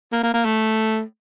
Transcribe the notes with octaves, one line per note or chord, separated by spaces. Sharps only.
A#3
A#3
A#3
A3